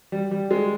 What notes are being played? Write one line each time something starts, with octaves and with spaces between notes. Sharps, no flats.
G3
G3
G#3